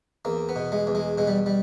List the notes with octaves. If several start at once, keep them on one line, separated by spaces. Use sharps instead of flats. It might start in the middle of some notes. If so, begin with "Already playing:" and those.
E2 A#3
B3
B2
G#3
E2
G#3
B2 G#3
G3
G3